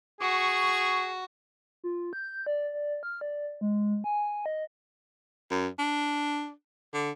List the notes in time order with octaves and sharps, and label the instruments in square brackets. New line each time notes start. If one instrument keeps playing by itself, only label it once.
[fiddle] F#4 [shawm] G#4 [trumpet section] C#6
[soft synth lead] F4
G6
D5
D5
F6
D5
G#3
G#5
D#5
[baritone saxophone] F#2
D4
D3